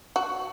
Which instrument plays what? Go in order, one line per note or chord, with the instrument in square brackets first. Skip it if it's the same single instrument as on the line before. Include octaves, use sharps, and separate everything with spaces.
[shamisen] F#4